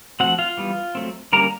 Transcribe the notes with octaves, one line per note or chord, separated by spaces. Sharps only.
F3 A3 C4 F#4 F#5
F4 F5
E3 G3 B3
F#3 A3 C4
D3 G3 A#3 C#4 A#4 A#5